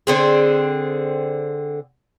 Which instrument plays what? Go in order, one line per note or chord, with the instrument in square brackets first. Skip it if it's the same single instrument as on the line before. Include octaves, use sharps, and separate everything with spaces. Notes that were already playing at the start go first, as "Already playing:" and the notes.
[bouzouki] D3 C4 G#4